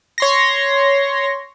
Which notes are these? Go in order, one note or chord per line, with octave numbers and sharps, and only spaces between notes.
C#5 C6 A#6